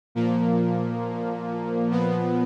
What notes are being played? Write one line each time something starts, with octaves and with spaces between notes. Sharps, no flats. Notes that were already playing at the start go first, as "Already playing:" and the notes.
A#2 F3 A#3
A#2 F3 B3